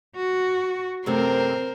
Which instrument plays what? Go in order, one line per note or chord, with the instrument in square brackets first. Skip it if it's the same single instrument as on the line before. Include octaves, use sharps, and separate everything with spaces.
[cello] F#4
[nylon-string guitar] F#2 C3 A3 [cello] C4 [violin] A#4 C5